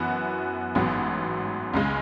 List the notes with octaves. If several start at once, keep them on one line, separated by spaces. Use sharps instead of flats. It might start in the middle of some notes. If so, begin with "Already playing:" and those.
Already playing: F#2 E3 B3 F#4
A1 G#2 F#3 B3
C#2 C#3 G#3